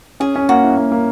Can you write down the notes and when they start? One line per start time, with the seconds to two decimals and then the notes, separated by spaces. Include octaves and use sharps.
0.20 C#4 G#4
0.36 C#4
0.49 A#3 F#4
0.63 E4
0.77 A#3
0.92 A#3